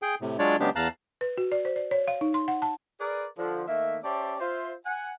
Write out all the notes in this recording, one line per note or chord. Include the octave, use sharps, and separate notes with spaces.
G#4 G5
A2 C3
F#3 G#3 D4 F4 C#5 D5
C#3 F#3 G#3 B3 D4 G4
E2 F5 A5 A#5 F#6
B4
F#4
D5
C5
D5
C#5
F5
D#4
C6
F#5
A5
G#4 A#4 B4 D5
D3 F3
D#3 A3 A#3 E5
C#4 G4 C5 D5 E5 A5
F4 C5 E5
F#5 G#5